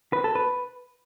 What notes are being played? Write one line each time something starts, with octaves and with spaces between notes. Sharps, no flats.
B4
A4
B4